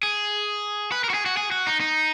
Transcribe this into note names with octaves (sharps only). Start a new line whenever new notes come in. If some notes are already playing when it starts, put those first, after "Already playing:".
G#4
B4
A#4
F#4
G#4
F#4
G#4
F#4
D#4
D#4